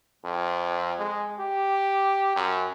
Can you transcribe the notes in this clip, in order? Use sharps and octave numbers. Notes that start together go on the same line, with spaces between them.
F2
G#3
G4
F#2